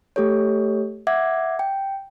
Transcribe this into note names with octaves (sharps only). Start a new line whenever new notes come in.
A3 G4 A4 C#5
E5 F#5 D6 G#6
G5